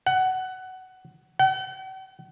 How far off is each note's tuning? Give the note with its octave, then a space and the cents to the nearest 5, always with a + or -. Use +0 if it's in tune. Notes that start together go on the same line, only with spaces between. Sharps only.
F#5 +15
F#5 +45